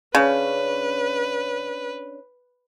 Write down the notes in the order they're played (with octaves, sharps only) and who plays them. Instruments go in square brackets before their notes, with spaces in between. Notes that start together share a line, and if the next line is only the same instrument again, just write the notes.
[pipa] C#3 [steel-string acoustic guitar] C#4 D4 [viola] B4